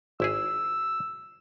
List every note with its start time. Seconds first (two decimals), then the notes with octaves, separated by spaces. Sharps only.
0.20 G#1 E4 G#4 E6